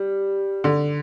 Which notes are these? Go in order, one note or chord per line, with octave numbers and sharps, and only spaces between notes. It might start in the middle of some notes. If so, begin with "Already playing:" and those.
Already playing: G3
D3